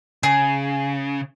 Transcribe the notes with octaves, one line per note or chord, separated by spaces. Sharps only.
C#3 G#4